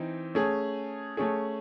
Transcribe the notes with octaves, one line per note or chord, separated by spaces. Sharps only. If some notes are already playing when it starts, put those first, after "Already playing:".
Already playing: E3 C4 D#4
A3 C#4 G#4
A3 C#4 G#4